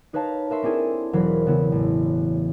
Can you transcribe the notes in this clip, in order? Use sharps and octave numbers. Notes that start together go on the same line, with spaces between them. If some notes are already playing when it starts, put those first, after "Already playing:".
D#4 B4 C#5 F5 A5 A#5
A#4 B4 E5 C6 C#6
C4 D4 E4 G#4 A4
E1 E3 F#3 A#4 C5 B5
C#3 B3 E4
A1